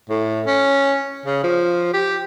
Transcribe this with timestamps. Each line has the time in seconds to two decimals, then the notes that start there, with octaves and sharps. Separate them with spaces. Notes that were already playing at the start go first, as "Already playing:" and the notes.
0.10 A2
0.47 C#4
1.26 C#3
1.44 F3
1.94 G4